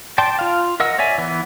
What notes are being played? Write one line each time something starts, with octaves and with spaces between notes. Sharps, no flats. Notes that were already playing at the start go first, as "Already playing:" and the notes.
D5 G5 A5 C6
F4 F5
A#4 D#5 F#5 E6
C#5 D5 E5 G#5
E3 B3